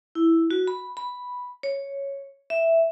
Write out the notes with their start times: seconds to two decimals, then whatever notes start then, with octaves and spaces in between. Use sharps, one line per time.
0.15 E4
0.51 F#4
0.68 B5
0.97 B5
1.63 C#5
2.50 E5